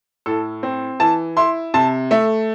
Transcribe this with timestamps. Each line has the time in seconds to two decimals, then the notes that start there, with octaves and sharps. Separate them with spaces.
0.26 A2 A4
0.63 C4
1.00 E3 A5
1.37 E4 C6
1.74 C3 A5
2.11 A3 E5